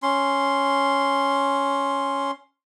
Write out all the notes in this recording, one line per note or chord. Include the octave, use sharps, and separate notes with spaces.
C#4 C6